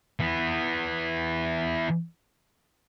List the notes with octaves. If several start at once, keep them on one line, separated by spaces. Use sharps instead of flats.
E3 B3